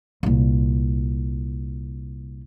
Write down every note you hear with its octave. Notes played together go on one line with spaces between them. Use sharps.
C2 A#2